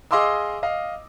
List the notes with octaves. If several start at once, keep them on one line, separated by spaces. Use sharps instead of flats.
G#4 D#5 F5 C6 D6 E6
D#5 F5